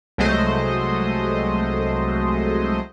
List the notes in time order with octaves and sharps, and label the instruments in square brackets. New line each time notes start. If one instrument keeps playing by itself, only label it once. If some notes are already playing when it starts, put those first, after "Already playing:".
[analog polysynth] C2 F#3 G#3 A3 C5 D#5